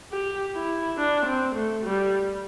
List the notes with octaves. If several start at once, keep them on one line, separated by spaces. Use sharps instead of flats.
G4
E4
D4
C4
A3
G3